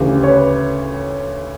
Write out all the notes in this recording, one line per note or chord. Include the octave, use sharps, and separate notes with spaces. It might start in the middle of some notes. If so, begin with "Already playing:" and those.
Already playing: D2 C#3 E3 G4
C#5
B4